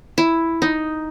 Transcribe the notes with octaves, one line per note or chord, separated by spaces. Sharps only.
E4
D#4